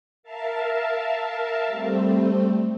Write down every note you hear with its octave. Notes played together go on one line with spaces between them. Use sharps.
A#4 E5 F5 A5
G3 A3 C4